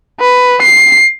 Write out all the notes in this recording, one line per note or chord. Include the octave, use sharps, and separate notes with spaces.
B4
C7